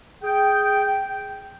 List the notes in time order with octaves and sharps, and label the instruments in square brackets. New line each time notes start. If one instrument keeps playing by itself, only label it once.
[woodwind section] G#4 G5